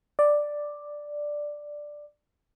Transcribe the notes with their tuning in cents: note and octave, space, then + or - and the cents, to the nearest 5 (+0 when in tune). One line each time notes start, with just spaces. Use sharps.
D5 +5